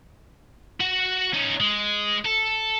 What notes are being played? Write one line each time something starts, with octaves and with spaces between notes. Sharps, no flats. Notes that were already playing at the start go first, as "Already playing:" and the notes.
F#4 F#5
C#4 D#4
G#3
A4